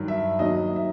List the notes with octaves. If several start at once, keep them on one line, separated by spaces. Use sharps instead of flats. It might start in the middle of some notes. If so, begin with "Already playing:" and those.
Already playing: G2 D#3 F#3
E5
D#2 D#3 F#3 D#5
E5